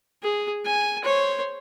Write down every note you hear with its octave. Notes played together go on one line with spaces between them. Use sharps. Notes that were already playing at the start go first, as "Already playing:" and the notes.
G#4
G#5
C5 C#5